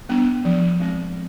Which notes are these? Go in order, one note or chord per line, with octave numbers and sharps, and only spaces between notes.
G3 B3 D4
F3
G#3 C4